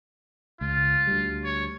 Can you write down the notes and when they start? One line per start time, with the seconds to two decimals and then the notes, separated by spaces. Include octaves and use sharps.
0.61 C#2 F4
1.07 D2 G3
1.44 C#5